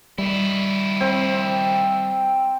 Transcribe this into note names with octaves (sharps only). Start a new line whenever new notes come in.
D#3 G3 E4
C4